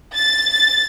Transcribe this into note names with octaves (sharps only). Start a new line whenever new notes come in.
A6
A6